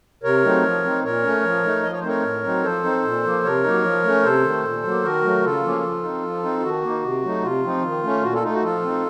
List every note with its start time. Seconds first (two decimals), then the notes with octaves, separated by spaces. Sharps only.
0.23 C3 A#4 C#5
0.44 F#3 A3 C4 D#4
0.64 F3
0.84 C4 D#4
1.04 A#2 A#4 C#5
1.24 A3 C#4
1.44 F3
1.63 A3 D#4
1.83 F3 D#5
1.92 C#5
2.00 C5
2.04 A3 C4 D#4 A#4 C#5
2.23 A2
2.43 F#3 C4 D#4
2.64 F3 A4 C5
2.84 C4 D#4
3.04 A#2
3.24 F3 A#3
3.44 C3 A#4 C#5
3.64 F#3 A#3 D#4
3.84 F3
4.04 A3 C#4
4.23 C3 A4 C5
4.44 D#3 A3
4.63 A#2
4.83 F#3 A#3
5.03 D#3 F#4 A#4
5.23 F#3 A3
5.43 C#3 F4 A4
5.63 F3 A#3 C#4
5.83 F3
6.03 C4 D#4
6.23 F3
6.43 C4 D#4
6.59 F4
6.63 D#3 F#4
6.83 A#3 D#4
7.03 C3
7.23 F#3 A3 D#4
7.43 C3 F4
7.63 F3 C4 D#4
7.83 D#3
8.03 A3 C#4
8.23 A#2 F#4
8.33 F4 A4
8.43 A3 D#4 F4
8.53 F#4
8.63 F3 F4 A4
8.83 C4 D#4